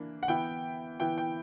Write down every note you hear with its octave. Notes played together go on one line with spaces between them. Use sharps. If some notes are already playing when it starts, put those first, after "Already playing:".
Already playing: E3 A#3 D4
F#5
E3 B3 E4 G5
E3 B3 E4 G5
G5